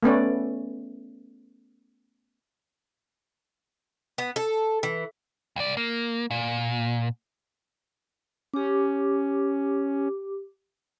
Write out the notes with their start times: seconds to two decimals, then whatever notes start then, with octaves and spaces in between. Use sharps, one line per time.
0.03 A3 B3 C#4 D5
4.18 B3
4.36 A4
4.83 E3
5.56 C2 D5
5.77 A#3
6.31 A#2
8.54 C#4 G4 D6